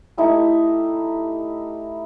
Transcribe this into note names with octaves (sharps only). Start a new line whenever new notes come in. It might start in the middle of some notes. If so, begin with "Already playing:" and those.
A3 D#4 E4 G4